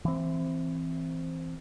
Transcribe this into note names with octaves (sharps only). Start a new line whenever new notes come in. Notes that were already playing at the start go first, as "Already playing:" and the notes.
E3 C4